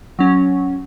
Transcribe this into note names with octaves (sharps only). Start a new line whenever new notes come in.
F#3 C#4